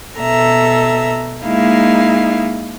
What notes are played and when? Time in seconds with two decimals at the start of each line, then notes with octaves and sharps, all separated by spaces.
0.19 B2 A4 E5 A#5
1.45 G#3 A#3 D#4 E4 F5